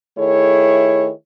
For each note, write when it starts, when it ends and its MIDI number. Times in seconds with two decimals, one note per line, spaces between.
0.18 1.09 51
0.18 1.09 57
0.18 1.09 64
0.18 1.09 68
0.18 1.09 73